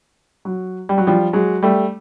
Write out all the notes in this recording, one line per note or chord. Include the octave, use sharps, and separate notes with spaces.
F#3
G3
F#3
F3 G3
F#3 G#3
G3 A3